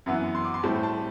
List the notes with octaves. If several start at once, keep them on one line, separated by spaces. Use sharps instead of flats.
F#2 E3 B3
C6
D6
C6
A2 G3 C4 A5
A5